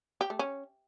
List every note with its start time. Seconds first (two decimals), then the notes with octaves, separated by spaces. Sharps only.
0.21 G4
0.30 A3
0.39 C#4